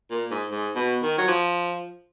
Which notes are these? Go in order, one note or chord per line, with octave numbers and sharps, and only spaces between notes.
A#2
G#2
G#2
B2
D#3
F#3
F3